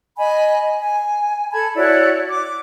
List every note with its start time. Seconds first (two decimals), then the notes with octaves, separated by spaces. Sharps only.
0.17 D#5 G#5 B5
0.80 G#5
1.51 A4 A5 B5 G#6
1.76 E4 F#4 C#5 D5
2.30 D6